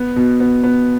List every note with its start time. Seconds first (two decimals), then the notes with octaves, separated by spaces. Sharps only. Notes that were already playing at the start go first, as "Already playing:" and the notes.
Already playing: B3
0.16 B2
0.40 B3
0.64 B3